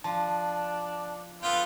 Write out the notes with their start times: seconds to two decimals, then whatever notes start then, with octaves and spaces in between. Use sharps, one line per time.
0.04 F3 D4 A5
1.43 B3 F4 A4 B4 G5